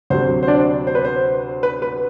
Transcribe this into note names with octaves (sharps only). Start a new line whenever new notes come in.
D2 C3 F#3 C5
C5
D4 D5
C5
B4
C5
B4
B4